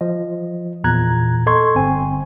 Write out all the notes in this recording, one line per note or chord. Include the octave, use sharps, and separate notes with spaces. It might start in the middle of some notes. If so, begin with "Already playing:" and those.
F3 D#5
E2 A#2 A#5 F#6 G#6
A4 D#5 C6 C#6 G#6
G1 C4 G#5